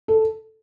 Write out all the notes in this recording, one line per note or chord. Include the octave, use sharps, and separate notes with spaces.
A4